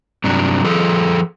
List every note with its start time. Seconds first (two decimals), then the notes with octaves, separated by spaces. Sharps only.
0.24 G2 C3 F#3 D4
0.65 F3 G#4 A4